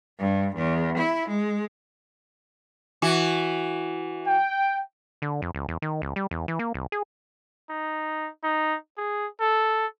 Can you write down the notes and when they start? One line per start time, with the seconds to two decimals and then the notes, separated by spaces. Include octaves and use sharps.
0.19 G2
0.55 E2
0.97 E4
1.28 G#3
3.02 E3 F#4
4.28 G5
5.22 D3
5.42 F2
5.55 C#2
5.69 E2
5.82 D#3
6.02 C#2
6.16 G3
6.31 E2
6.48 E3
6.59 A#3
6.74 C2
6.92 G#4
7.70 D#4
8.43 D#4
8.98 G#4
9.41 A4